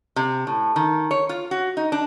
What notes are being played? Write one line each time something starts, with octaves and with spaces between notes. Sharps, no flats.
C3
A2
D#3
C#5
F4
F#4
D#4
D4